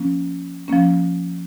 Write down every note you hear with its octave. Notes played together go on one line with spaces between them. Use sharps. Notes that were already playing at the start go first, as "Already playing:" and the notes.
Already playing: F3 A#3 C#4
F3 A#3 C#4